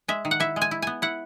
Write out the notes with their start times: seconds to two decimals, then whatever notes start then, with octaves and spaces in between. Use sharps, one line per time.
0.08 G#3 E5
0.25 D#3
0.31 F#5
0.40 E4 E5
0.56 G#3
0.62 G#5
0.71 E4
0.82 B3 G#5
1.02 E4 F#5